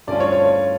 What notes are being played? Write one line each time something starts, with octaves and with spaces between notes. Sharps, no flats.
G2 D3 A3 C#4 F4 D5
C#5
C#5
C#5